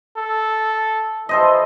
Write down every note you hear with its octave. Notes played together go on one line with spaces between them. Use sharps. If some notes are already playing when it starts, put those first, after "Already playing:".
A4
E3 A4 C5 D#5